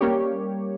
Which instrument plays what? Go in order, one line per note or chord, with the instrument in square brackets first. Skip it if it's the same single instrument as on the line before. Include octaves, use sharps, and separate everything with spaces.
[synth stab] G3 A#3 C#4 G4 C#5